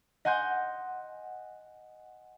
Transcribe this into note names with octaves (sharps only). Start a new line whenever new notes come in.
D#5 F#5 G#5 C6 G6